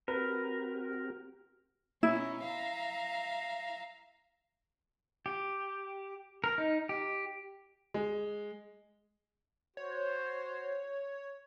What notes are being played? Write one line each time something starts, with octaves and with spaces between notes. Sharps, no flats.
C4 F#4 G4 A#4 B4
B2 C#4 D#4 E4
E5 F5 A#5
G4
A#4
D#4
G4
G#3
F#4 C5 C#5